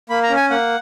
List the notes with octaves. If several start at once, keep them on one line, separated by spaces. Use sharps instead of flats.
A#3 B5
A#5
C#4
G#5
A#3 F#5